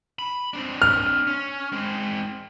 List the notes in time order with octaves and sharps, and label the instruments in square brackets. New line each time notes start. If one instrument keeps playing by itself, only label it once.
[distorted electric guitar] B5
C4 D4
[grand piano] F6
[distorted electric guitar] C#4
G#3 C4